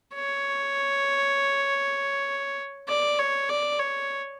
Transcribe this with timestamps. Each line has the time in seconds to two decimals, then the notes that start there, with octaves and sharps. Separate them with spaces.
0.15 C#5
2.89 D5
3.19 C#5
3.50 D5
3.79 C#5